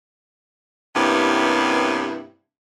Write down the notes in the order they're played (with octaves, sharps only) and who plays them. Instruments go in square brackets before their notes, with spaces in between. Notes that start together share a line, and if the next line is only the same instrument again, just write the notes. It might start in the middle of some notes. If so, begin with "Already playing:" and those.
[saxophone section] G2 C3 A#3 B3 C#4 E4